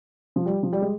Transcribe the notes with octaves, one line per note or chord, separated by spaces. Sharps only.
F3
G3
F3
G3
G#3